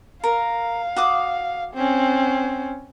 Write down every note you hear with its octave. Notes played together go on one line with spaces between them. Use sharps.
A#4 F5
F#4 D6 D#6
C4 C#4